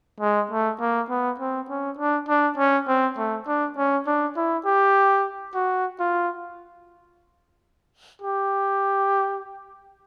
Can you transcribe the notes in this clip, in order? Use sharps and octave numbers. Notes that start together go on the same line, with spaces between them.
G#3
A3
A#3
B3
C4
C#4
D4
D4
C#4
C4
A3
D4
C#4
D4
E4
G4
F#4
F4
G4